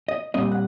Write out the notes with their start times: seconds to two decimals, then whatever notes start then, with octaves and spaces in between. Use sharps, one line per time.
0.08 D#5
0.34 A#2 G3 C4 D#5
0.52 F#5